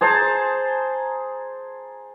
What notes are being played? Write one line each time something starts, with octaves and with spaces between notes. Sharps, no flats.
G#4 C5 A5 A#5